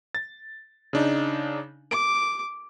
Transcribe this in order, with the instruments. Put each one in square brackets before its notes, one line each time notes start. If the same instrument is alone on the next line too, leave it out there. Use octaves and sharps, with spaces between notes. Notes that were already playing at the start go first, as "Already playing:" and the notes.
[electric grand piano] A6
C#3 D4 D#4
[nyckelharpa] D6 [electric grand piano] D7